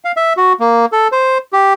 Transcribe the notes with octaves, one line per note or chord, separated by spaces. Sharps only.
F5
E5
F#4
A#3
A4
C5
G4